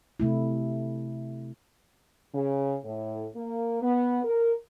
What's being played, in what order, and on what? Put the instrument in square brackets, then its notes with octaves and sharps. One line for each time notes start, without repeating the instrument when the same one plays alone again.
[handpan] C3 A3 E4
[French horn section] C#3
A2
A#3
B3
A#4